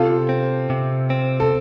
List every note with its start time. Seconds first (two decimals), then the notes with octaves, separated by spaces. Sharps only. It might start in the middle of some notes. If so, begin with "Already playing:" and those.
Already playing: C3 F4 A4
0.29 C4
0.70 C3
1.10 C4
1.40 A4